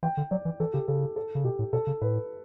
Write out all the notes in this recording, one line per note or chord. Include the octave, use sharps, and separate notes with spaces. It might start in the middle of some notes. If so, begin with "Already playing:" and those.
E3 G5
D3
F#3 D5
E3
E3 A4
C#3 G4
C#3 A4
A4
C#3
B2 G4
A2
B2 A4
C#3
A2 B4